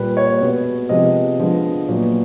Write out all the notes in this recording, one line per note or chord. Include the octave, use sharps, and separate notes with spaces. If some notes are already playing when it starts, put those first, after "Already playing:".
Already playing: A#2 G3 A#3 B4
C#5
B2 G#3 B3
C3 F3 G#3 B3 D#5
D3 F3 G#3 B3
A#2 F#3 B3